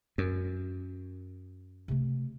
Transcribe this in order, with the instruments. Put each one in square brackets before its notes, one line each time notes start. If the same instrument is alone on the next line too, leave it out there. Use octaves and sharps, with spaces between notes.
[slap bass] F#2
[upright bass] C3 A3